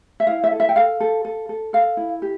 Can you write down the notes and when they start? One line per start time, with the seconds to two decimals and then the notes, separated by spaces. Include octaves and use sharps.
0.20 E5
0.27 E4 F5
0.44 E5
0.52 A4
0.60 E5
0.69 G5
0.76 A4 F5
1.00 A4
1.25 A4
1.49 A4
1.73 A4 F5
1.97 E4
2.22 G4